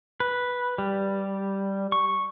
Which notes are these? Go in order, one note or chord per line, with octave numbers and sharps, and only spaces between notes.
B4
G3
C#6